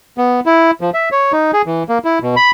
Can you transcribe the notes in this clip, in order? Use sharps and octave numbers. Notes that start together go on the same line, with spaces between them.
B3
E4
F3
E5
C#5
D#4
G#4
E3
A#3
E4
B2
B5